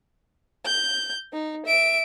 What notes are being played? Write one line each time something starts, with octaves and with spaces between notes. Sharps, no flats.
G6
D#4
E5 D7